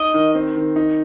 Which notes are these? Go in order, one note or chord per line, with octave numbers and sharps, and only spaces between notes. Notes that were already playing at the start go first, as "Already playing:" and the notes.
Already playing: D#4 D#5
D#3
C4
D#3
D#4